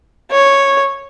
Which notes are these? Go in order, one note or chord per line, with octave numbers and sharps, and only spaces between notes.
C#5